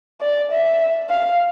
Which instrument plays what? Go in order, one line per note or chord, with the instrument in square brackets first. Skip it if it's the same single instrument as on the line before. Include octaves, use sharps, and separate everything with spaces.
[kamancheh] D5
E5
F5